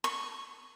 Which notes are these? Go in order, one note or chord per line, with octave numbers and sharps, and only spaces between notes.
C#6